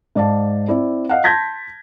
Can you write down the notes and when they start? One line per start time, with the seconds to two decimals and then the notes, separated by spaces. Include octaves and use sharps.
0.15 G#2 D5 F5 A5
0.68 C4 E4 D5
1.09 D#5 F5 F#5
1.24 A5 C6 G6 G#6 A#6 B6